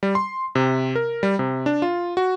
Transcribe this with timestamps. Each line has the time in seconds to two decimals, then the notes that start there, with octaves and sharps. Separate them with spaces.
0.03 G3
0.15 C6
0.55 C3
0.95 A#4
1.23 G3
1.39 C3
1.66 D4
1.82 F4
2.17 F#4